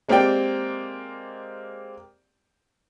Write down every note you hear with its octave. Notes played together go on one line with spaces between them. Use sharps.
G#3 A#3 C4 G4 D5 G5